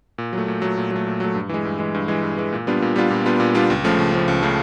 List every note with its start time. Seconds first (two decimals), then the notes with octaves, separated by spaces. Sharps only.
0.18 A#2
0.33 F#3 A3
0.48 A#2
0.62 F#3 A3
0.77 A#2
0.91 F#3 A3
1.07 A#2
1.20 F#3 A3
1.35 G2
1.49 E3 G#3
1.65 G2
1.79 E3 G#3
1.94 G2
2.08 E3 G#3
2.23 G2
2.37 E3 G#3
2.53 A#2
2.67 G3 B3 D4 F4
2.82 A#2
2.96 G3 B3 D4 F4
3.10 A#2
3.26 G3 B3 D4 F4
3.40 A#2
3.55 G3 B3 D4 F4
3.70 C#2
3.84 C#3 F3 A3
3.99 C#2
4.14 C#3 F3 A3
4.28 C#2
4.42 C#3 F3 A3